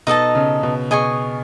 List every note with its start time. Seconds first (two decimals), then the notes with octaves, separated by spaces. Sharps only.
0.07 B2 D#4 A4 D#5 A5
0.35 C#3
0.63 B2
0.91 B2 G#4 D#5 G#5 C#6